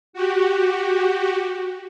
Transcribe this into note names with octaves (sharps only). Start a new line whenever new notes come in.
F#4 G4